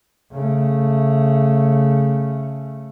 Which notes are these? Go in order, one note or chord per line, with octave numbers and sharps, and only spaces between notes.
C#3 A3